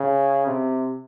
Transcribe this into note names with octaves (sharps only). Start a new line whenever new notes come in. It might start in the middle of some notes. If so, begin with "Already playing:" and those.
Already playing: C#3
C3